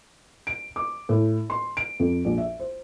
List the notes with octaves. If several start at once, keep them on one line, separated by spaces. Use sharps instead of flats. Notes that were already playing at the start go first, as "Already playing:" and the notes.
D7
D6
A2
C6
D7
F2
A#1
E5
C5